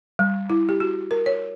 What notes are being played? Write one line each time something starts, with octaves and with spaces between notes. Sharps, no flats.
G3
E4
G4
F#4
A#4
C#5